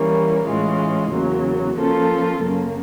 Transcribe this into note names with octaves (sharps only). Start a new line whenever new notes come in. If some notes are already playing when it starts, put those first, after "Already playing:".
Already playing: E3 G3 A#3 C#4
A2 E3 G#3 C#4 F4
E2 C#3 F#3 A#3
F3 A#3 C#4 F4 A4
F#2 C#3 F#3 A#3